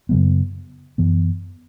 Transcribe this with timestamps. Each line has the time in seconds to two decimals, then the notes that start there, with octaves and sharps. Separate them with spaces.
0.09 F#2 C#3 F#3 B3
0.98 F#2 E3 B3